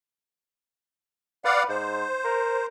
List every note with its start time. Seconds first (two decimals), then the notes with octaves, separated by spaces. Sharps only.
1.45 B4 D5 F5 F#5
1.69 G#2 C5
2.24 A#4